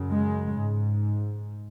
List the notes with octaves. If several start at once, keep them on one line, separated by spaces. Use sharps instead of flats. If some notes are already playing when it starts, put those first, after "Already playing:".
Already playing: F#2 C#3
G#3
G#2